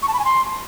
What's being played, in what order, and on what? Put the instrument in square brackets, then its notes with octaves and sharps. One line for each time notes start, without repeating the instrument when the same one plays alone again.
[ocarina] C#6
A5
B5
G#5
C6